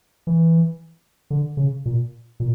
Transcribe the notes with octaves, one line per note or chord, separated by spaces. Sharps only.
E3
D3
C#3
A#2
A#2